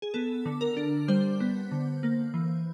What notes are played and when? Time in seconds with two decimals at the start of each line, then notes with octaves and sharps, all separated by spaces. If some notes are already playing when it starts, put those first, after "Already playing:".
0.02 G#4
0.14 B3 A4
0.46 D3
0.61 A#4
0.77 D4
1.08 G3 C5
1.40 B3
1.71 D3
2.03 A#3
2.34 E3